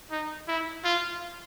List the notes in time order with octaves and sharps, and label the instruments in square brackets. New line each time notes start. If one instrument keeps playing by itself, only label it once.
[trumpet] D#4
E4
F4